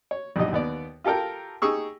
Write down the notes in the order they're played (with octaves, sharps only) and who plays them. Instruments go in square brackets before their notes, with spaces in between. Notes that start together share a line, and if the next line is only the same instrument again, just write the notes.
[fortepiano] C#5
A#1 F#2 B2 D#4 G4 D#5
D#2 B3 D5
F4 G4 A4 A#4 G5
D#4 G4 G#4 C#6 E6